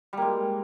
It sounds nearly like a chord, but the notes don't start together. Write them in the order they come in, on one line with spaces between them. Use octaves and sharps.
G3 A#3 G#3